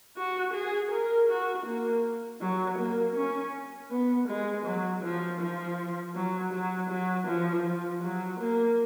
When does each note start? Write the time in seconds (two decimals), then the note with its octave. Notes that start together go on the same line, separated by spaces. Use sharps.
0.17 F#4
0.54 G#4
0.91 A#4
1.29 F#4
1.66 A#3
2.41 F#3
2.78 A#3
3.16 C#4
3.90 B3
4.28 G#3
4.66 F#3
5.04 F3
5.40 F3
6.15 F#3
6.53 F#3
6.90 F#3
7.27 F3
7.65 F3
8.03 F#3
8.40 A#3